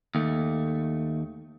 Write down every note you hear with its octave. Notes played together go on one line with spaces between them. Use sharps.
D#2 A3